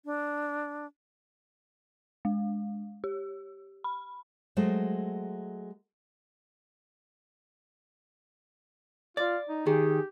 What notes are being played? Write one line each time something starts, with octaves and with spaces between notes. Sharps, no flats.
D4
G#3
G4
B5
F#3 G#3 A3 C5
F4 D5
D#4
D#3 G4 G#4